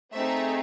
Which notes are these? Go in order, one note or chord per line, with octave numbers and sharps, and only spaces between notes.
A3 C4 D#4 G#4 E5